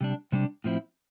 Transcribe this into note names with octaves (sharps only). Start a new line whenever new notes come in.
C3 G3 D4
C3 G3 D4
A2 F3 C4 E4